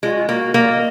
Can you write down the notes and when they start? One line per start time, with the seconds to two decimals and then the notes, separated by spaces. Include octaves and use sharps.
0.03 G#3 F4
0.11 F#4
0.18 F4
0.29 A#3 F#4
0.54 A#3 D#5
0.61 D5
0.69 D#5